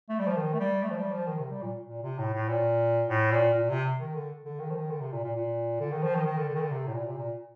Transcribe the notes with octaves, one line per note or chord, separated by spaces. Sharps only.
A3
G3
F3
D#3
A3
G3
A3
F3
G3
F3
D#3
C3
G3
A#2
A#2
C3
A2
A2
A#2
A2
A#2
A#2
C3
D#3
D3
D3
D#3
F3
D#3
D3
C3
A#2
A#2
A#2
D3
D#3
F3
D#3
D#3
D3
D3
D#3
D3
C3
A2
A#2
C3
A#2